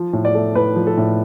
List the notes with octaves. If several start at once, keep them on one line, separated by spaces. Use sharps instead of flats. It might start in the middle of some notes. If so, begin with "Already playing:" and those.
Already playing: F3
A2
D5
A3
A2 B4
F3
A4
A2